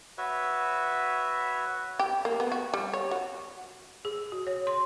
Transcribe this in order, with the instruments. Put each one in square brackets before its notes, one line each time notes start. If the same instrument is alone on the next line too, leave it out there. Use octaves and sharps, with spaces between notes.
[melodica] F#4 B4 C#5 E5
[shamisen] G4
A#3
B3
F#4
G3
C#5
F#4
[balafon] G#4
F#4
C#5
C6